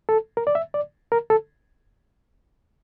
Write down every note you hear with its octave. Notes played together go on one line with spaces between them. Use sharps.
A4
A#4
D5
E5
D5
A#4
A4